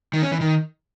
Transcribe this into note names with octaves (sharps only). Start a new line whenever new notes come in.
D#3
C#4
E3
D#3